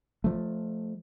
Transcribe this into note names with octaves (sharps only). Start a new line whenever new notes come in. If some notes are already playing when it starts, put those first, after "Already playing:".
F3 A3